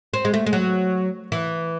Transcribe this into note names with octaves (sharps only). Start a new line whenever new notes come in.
C4
G#3
A3
G#3
F#3
E3